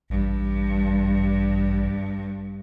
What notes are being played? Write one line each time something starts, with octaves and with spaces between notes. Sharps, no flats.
A1 G2